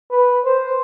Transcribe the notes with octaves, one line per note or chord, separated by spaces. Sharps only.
B4
C5